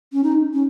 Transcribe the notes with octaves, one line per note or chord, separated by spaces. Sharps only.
C#4
D#4
C#4